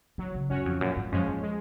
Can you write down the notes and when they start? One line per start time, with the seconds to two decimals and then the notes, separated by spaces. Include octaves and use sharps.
0.18 D#3 F#3
0.34 C#3
0.50 F#2 C#4 F#4 C#5
0.66 F2
0.81 F#2 A#2
0.97 G#2
1.12 F#2 F3 G#3 C#4
1.28 F#2
1.43 G#3